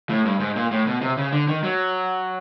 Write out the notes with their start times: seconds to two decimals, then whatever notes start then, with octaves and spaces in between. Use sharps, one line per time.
0.09 A2
0.25 G2
0.40 G#2
0.56 A#2
0.71 A2
0.87 B2
1.02 C3
1.17 C#3
1.33 D3
1.48 D#3
1.64 F#3